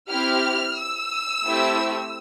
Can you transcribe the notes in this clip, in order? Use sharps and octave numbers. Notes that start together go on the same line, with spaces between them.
C4 E4 G4 F6
E6
A3 C4 E4 G4